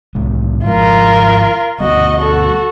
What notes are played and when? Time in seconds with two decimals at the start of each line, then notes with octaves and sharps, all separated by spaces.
0.15 C2 A2 G#3
0.65 G#1 F3 G#3 F4 A#4
1.80 D2 G3 B3 F#4 D#5
2.18 F#4 A4